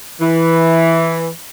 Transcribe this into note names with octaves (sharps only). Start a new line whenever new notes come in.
E3